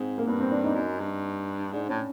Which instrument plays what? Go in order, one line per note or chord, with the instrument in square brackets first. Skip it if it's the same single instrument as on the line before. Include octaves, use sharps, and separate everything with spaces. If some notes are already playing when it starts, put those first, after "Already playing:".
Already playing: [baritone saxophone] G#2 [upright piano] C4
[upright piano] A#3
[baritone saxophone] G2 [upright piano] B3
[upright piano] C4
D4
D#4
[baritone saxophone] F#2
G2
[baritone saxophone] G#2 [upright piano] D4
[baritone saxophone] A2 [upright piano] C#4